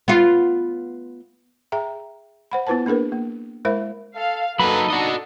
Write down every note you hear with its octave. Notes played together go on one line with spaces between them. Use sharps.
B3 F4
G#4 E5 G5 A#5
C5 F#5 B5
B3 E4 F4 B4 C5 A5
A#3 D4 G#4 A#4 B4
A#3
G#3 E4 A#4 C5 E5 B5
A4 F5
F#3 A#3 D#4 A4 B4 B5
D4 F#4 D#5